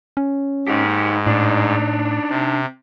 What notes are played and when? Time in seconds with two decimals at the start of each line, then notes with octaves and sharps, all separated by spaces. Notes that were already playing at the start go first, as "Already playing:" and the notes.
0.17 C#4
0.68 G#2 D#4 G4
1.27 A2 D4 D#4
2.29 C3